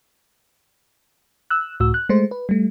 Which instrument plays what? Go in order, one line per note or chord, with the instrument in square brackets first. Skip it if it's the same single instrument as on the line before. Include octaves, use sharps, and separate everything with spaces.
[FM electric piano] E6 F#6
C#2 A2 F#4 E6
F#6
G#3 A3 C5
B4
G3 A3